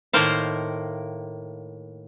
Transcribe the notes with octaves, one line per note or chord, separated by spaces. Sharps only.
A2 D#3 A#3 A#4 C5 F5